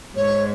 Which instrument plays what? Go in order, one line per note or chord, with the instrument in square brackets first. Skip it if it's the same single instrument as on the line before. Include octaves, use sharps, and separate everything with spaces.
[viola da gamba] G#2 [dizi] C#5